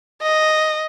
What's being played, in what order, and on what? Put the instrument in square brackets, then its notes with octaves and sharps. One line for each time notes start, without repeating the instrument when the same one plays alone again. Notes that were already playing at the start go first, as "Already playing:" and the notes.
[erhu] D#5